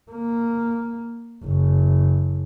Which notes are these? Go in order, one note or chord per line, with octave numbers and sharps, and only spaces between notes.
A#3
F#1